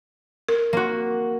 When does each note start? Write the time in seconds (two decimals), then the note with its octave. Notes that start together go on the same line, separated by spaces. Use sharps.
0.49 A#4
0.73 A#3 F#4